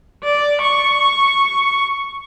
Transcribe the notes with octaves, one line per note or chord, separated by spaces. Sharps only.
D5
C#6